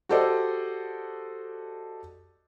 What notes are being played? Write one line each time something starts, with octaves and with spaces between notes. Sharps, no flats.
F#4 G4 A4 C5 D5 D#5